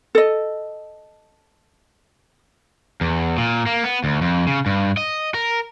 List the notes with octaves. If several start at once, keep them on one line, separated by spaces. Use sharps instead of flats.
A4 D#5
E2
A#2
A#3
B3
D2
F2
C#3
G2
D#5
A#4